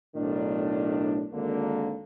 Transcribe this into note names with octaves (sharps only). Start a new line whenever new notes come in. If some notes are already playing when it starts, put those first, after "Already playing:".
B1 A2 D#3 D4
G#1 D3 A#3